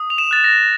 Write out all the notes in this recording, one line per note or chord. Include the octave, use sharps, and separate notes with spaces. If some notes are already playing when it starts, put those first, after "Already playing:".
Already playing: D#6
F7
E7
F#6 A6
A#6